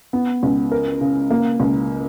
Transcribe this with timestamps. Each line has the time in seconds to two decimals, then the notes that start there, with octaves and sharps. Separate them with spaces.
0.13 B3
0.43 C#2
0.72 A#4
1.01 C#3
1.30 A#3
1.60 C#2